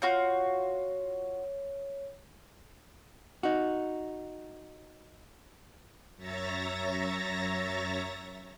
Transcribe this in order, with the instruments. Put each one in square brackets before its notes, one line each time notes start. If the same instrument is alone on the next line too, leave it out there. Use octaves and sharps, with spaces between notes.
[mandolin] F4 F#4 G6 [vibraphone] C#5
[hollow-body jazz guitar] D#4 F#4
[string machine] F#2 C#5 E5 A#5 A6 A#6